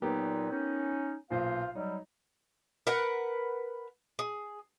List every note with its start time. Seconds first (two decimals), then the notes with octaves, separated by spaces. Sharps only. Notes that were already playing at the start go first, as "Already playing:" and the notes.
0.02 A#2 F#3 A#3 B3 D#4 G4
0.50 C#4 D#4
1.30 B1 A#2 F4 C5 F5
1.75 F#3 G3 D#4
2.87 A#4 B4 F#5
4.19 G#4